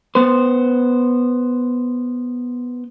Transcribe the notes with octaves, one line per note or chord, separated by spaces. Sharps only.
B3 C5